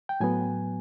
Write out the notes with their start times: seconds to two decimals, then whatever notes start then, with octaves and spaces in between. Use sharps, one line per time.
0.09 G5
0.20 A2 F#3 B3 G#5